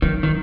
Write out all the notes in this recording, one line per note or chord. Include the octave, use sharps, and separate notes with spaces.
D#3 F#3
D#3